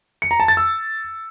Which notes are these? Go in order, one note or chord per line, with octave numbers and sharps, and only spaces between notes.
C#7
A#5
A5
A6
E6